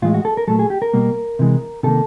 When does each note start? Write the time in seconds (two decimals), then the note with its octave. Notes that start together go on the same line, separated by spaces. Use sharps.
0.02 A2 E3 G#3 F4
0.14 F#4
0.25 A4
0.37 A#4
0.48 A#2 F#3 A3 A4
0.59 G#4
0.70 G4
0.82 A#4
0.93 B2 G3 A#3
1.39 C3 E3 G#3
1.83 C3 D#3 G3 A#3 A4